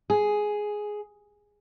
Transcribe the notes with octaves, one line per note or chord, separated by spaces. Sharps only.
G#4